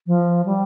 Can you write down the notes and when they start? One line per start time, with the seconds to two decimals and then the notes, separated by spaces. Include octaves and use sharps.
0.07 F3
0.46 G3